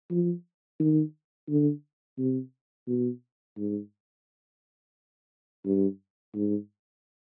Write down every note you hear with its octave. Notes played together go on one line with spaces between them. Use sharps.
F3
D#3
D3
C3
B2
G#2
G2
G#2